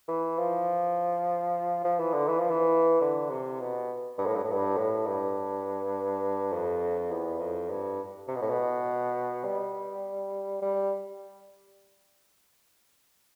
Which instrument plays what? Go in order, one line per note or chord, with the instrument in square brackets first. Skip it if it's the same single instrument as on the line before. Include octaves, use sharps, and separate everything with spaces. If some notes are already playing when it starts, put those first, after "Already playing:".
[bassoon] E3
F3
F3
E3
D3
E3
F3
E3
D3
C3
B2
G2
A2
G2
A2
G2
A2
G2
F2
E2
F2
G2
C3
B2
A2
B2
G3
G3